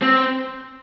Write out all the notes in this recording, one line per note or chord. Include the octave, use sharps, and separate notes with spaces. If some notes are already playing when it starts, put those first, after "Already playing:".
C4